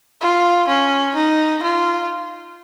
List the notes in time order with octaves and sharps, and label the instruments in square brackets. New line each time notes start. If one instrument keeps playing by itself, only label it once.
[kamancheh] F4
C#4
D#4
F4